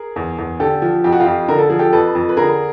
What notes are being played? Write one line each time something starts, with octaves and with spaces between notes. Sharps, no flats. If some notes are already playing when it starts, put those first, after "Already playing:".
Already playing: G#4 A#4
E2
E2
D3 G4 A4
F3
F2 G4
F#4
F4 G4
F2
D3 A#4
A4
F3 G#4
G4 A4
F2 A4 B4
F2
B4
D3 G#4 A#4